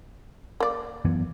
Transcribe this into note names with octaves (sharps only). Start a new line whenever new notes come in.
A#3 D5
F#2 E3 B3